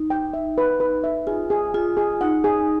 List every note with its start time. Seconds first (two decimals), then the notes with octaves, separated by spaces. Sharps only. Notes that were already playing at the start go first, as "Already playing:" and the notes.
Already playing: D#4
0.10 G5
0.34 E5
0.58 B4
0.80 B4
1.04 E5
1.27 F4 G#4
1.50 G#4
1.74 F4 G#4
1.97 G#4
2.21 D#4 F#5
2.44 G#4